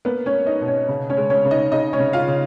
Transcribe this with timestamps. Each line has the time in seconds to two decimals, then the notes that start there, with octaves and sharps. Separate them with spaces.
0.05 A#3 B3 B4
0.26 C#4 C#5
0.34 A#3
0.46 D#4 D#5
0.61 B2
0.68 C#4 C#5
0.88 C#3
1.10 C#4 C#5
1.17 G#3
1.30 C#4 C#5
1.45 C#3
1.51 D#4 D#5
1.72 C#3 D#4 D#5
1.93 C#4 C#5
1.99 C#3
2.13 F4 F5
2.28 C#3